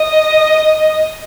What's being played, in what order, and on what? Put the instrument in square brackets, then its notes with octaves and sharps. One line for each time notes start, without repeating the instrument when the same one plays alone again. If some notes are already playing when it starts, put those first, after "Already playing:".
Already playing: [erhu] D#5